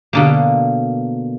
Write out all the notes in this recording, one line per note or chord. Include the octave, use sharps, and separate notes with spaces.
B2 D3 A#3